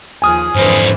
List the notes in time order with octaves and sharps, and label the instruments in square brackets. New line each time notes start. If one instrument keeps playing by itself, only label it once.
[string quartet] D#2 F3 G#4 [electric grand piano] G#5 D#6 F6
[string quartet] F2 D3 E3 [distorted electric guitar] G#2 B4 [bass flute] C5